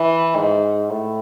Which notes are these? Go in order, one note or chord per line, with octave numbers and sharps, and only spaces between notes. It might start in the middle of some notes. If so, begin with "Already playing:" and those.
Already playing: E3
G#2
A2